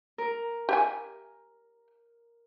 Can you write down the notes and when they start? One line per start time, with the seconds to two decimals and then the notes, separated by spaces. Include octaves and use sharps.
0.18 A#4
0.69 G4 E5 G#5